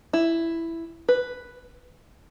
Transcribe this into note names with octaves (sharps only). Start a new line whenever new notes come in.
E4
B4